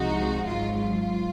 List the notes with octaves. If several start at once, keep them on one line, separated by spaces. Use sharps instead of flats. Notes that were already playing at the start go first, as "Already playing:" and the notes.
Already playing: C2 C3 F3 G#3 D#4 F#4
G#1 G#2 F#3 F4
F4